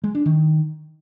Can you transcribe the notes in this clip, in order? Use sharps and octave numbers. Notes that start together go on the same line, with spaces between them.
G#3
D4
D#3